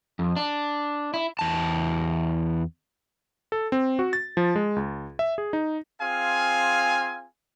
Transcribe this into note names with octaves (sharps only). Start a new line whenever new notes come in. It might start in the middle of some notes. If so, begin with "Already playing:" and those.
F2
D4
E4
E2 A5
A4
C4
F#4
A6
F3
G#3
C#2
E5
G#4
D#4
C4 F4 G#4 F5 G#5